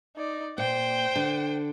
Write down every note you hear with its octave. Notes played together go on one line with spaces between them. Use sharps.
D#4 D5
A#2 C5 G5
D3